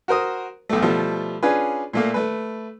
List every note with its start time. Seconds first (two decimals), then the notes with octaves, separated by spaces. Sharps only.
0.08 F#4 A#4 C5 D#6
0.69 B1 A3
0.82 B2 F3 G3 A3
1.43 C#4 D4 F4 G#4 B4
1.93 A#2 A3 A#3
2.14 A3 B4